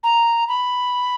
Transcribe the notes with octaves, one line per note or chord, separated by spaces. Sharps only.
A#5
B5